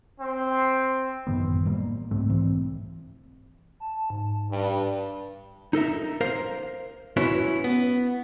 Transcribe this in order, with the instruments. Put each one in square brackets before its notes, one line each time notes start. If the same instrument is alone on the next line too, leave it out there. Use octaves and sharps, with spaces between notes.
[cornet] C4
[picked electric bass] A1 F#2 D#3 B3
A2 F3 G3 A#3
C2 G#2 A3 C4
B1 G#2 E3 C4
[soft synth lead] A5
G#2
[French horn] G2
[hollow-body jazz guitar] D#4 A4 A#4 E5
A#4 C5 F5
C#4 E4 F#4 B4 C#5
B3